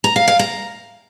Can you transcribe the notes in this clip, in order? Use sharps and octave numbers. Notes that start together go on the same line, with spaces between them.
A#5
F5
F5
A#5